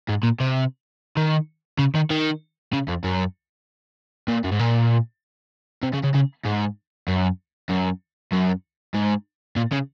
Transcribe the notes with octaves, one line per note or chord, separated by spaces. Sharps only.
G#2
A#2
C3
D#3
C#3
D#3
D#3
C#3
F2
F#2
A#2
F#2
G#2
A#2
C3
C#3
C#3
C#3
G#2
F#2
F#2
F#2
G#2
A#2
C#3